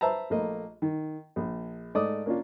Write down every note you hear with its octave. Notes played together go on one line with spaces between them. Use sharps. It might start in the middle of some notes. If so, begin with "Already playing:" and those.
B4 C5 E5 A5 A#5
A#1 A3 A#3 D#5
D#3
A#1
G#2 A3 D5 D#5 D6 D#6
A#3 C#4 D4 F4